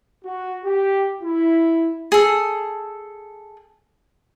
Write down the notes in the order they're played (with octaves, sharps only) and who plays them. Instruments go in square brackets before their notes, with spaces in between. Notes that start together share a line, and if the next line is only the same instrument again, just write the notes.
[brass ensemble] F#4
G4
E4
[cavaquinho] G#4 A4